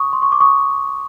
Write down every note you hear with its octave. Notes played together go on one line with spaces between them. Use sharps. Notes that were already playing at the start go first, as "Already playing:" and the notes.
Already playing: C#6 D#6
C6
C#6
D6
C#6 D#6